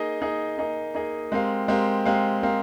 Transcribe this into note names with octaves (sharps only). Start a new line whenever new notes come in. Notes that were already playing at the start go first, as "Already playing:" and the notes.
Already playing: A#3 D#4 G#4 D#5
A#3 D#4 G#4 D#5
A#3 D#4 G#4 D#5
A#3 D#4 G#4 D#5
G#3 C4 G4 A#4 F5
G#3 C4 G4 A#4 F5
G#3 C4 G4 A#4 F5
G#3 C4 G4 A#4 F5